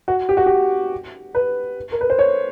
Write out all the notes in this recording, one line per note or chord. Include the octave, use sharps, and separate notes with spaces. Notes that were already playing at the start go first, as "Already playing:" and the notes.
F#4
G4
F#4
G4
B4
A#4
B4
C5
C#5